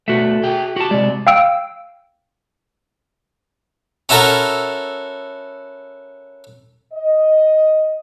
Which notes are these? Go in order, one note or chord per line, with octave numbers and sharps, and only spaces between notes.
B2 A3 F#4 E5
G#4 G5
F#4 G4 A5
C3 G#3 D5
F5 G5 E6 D7
C#4 E4 F#4 A4 A#4 E5
D#5